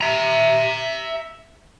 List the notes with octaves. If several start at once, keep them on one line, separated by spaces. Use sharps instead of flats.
E5 A#5